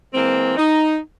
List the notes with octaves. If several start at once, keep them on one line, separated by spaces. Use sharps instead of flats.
E3 G#3 A#3 C4
D#4